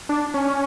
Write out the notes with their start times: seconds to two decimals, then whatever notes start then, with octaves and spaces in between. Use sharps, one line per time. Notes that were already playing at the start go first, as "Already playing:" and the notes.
0.09 D4
0.34 C#4